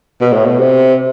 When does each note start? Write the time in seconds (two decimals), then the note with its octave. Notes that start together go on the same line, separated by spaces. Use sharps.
0.21 B2
0.33 A2
0.46 B2
0.60 C3